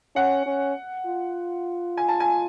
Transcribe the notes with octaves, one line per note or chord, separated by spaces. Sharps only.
C#4 F#5
C#4
F4
G#5
A5
G#5